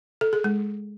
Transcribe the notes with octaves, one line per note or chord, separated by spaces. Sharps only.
A4
G#4
G#3